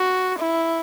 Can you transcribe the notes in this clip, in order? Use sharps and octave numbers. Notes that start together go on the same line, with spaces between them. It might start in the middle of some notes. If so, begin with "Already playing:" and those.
Already playing: F#4
E4